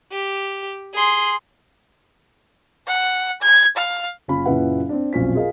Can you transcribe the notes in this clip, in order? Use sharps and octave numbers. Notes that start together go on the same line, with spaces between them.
G4
G#4 C6
F#5
G#6
F5
F#1 C#4 F4 B5
F#1 A#2 C#4 E4 B4 F#5
C4 D4
B1 F2 A#2 C#4 C5 B6
F4 G#4 A#4 D#5 F5